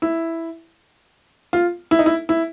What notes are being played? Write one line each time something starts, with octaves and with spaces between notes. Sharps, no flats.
E4
F4
E4
D#4
E4
E4